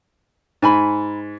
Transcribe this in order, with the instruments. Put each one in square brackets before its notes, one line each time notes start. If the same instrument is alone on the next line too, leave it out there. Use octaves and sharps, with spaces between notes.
[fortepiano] G#2 [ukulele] D#4 G#5 B5